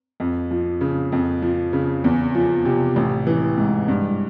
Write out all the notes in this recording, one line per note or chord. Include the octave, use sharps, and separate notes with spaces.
F2
F3
C#3
F2
F3
C#3
E2
F3
C3
A1
E3
G#2
G2